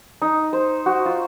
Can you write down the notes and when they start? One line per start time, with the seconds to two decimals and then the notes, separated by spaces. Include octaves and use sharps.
0.22 D#4
0.53 C5
0.86 F#4
1.06 F4